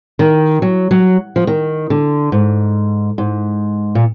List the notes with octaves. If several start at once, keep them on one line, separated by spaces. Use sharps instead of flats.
D#3
F#3
F#3
F3
D#3
D3
G#2
G#2
A#2